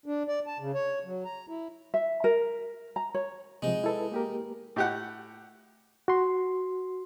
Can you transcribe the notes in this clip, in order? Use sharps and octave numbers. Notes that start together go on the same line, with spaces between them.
D4
D5
A5
C#3
C#5
F#3
A#5
E4
E5
A#4
A#5
C#5
C3 F3 G#3 D#4
E4 A4 B4
A#3 G4 A#4
A2 G4 F#5
F#4 C6